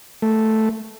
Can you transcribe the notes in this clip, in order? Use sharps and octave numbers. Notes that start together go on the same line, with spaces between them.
A3